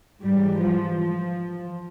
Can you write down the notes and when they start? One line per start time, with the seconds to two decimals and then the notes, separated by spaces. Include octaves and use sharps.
0.22 G#2 E3 G3
0.59 F3
0.96 F3